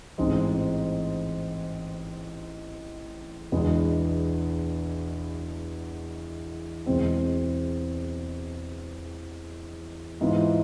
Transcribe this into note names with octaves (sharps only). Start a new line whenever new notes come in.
A1 G#2 G#3 C4
E2 B2 G#3 B3 D4
E2 B2 G#3 C4
G#2 E3 G#3 B3 F4